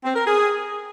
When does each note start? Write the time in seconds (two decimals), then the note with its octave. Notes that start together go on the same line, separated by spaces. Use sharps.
0.05 C4
0.16 A#4
0.27 G#4